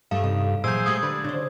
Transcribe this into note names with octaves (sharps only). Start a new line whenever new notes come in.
G2 A3 A4 F5
C3 D#4
A#2 E3 F#3 G#4 C5 E6 G6
G#3 A3 G4 D#6 G#6
D3 B4
C#3 D4 C5